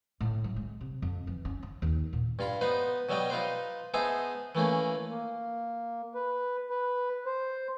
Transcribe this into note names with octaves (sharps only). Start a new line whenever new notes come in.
A2
F#3
G#3
C3
F2
E3
C#4
F3
D#2
A#2
G2 F4 B5
B3 D#4 B4 C5
B2 F#3 G3 D#5 G5
D#4 F4 B4 C5
B3 D#4 G#4 C5 E5 A5
E3 A3 A#3 C#4
A#3
B4
B4
C5